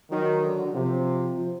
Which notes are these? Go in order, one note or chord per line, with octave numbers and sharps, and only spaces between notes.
D#3 F#3
D3
F#3
C3 F3
F3